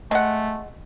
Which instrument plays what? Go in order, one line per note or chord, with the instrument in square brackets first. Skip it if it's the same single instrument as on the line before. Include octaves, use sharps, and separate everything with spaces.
[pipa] G#3 F#5 [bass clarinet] A3